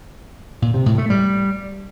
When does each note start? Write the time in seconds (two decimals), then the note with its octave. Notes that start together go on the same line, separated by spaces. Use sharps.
0.62 A#2
0.74 C3
0.86 A2
0.98 A3
1.10 G3